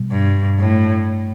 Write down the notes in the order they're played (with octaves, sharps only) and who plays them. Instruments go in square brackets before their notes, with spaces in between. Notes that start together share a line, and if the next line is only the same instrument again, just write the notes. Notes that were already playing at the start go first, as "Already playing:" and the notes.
Already playing: [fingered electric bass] B2 G3
[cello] G2
A2